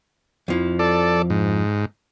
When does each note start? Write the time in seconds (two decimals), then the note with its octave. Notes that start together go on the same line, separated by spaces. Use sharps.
0.48 F2 F3 E4
0.79 A4 D5
1.30 G#2